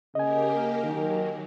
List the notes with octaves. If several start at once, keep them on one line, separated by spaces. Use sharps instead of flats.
C#3 A#3 G4 A#4 D#5 G#5
D#3 F#3